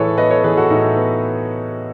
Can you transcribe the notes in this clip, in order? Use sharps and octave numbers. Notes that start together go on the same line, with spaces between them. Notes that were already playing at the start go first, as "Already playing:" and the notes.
Already playing: A2 E3 G#4 A4 B4 C#5
B3 B4 D#5
A4 C#5
E3 G#4 B4
F#4 A4
A2 D#4
B3